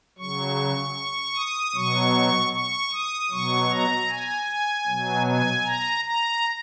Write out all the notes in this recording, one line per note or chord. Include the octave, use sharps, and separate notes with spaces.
C#3 F#3 C#6
D#6
B2 F#3 C#6
C#6
D#6
B2 F#3 C#6
A#5
G#5
B2 F#3
G#5
A#5
A#5